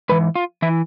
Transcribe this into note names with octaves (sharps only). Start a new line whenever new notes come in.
G#2 E3 B4
F4
E3 E4